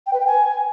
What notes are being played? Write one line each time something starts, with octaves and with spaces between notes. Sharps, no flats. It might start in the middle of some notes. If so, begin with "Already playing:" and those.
G5
B4
G5
G#5